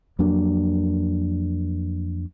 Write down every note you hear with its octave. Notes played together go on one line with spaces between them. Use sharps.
F2 F#3 A#3 D4